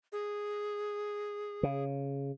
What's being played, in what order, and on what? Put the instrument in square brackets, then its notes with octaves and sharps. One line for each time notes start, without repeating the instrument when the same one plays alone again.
[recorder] G#4
[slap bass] C#3